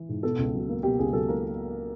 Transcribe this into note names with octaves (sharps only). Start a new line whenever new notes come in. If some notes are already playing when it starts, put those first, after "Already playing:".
Already playing: E3
G#2
B2 A4
C#2
F#3
A#3
B2 G4
C#2 G#4
F#3 A4
A#3 A#4